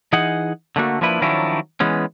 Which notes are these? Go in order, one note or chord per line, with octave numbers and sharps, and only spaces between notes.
E3 D#4 G#4 F#5
D3 A3 A#3 F#4
F3 A#3 D4 E4 B4
D#3 F3 F#3 C#4 D4 E4
E3 G#3 B3 C#4